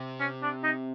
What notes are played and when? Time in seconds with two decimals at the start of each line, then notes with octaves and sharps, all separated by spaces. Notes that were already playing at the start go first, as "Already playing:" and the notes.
Already playing: C3
0.20 C#4
0.43 D4
0.64 D#4